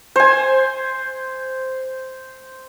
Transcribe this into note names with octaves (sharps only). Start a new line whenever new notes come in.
C5 G#5